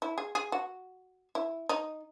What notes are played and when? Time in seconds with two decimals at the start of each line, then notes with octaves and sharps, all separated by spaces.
0.02 E4
0.18 G#4
0.35 G#4
0.52 F#4
1.35 E4
1.69 D#4